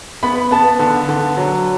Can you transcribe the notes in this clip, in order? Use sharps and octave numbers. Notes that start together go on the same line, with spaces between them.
B3 B5
B3 A5
D3
D3
F#3